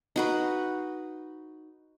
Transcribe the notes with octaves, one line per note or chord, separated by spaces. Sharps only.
D#4 F#4 B4